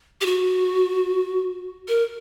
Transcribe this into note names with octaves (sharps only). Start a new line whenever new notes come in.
G4
F#4
A#4